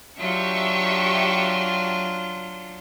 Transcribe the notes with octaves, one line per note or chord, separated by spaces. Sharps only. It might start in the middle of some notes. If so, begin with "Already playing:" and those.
F#3 D4 F4 G4 E5 C#6